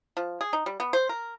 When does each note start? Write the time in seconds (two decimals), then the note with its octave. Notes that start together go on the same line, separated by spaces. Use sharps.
0.17 F3
0.41 G#4
0.53 D#4
0.66 G3
0.80 B3
0.93 C5
1.09 A#4